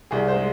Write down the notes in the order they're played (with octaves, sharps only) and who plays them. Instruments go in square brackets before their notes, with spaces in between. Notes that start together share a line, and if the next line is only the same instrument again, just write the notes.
[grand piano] C2 G#4
C5
G#3